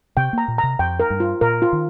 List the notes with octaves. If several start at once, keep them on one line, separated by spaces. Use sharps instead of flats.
C3 G5
A#3 A#5
A#2
A#5
C3
F2 G5
A#4
G2
F4
A#2 A#4
F4
D#3